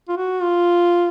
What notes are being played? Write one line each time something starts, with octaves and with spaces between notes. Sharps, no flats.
F4
F#4
F4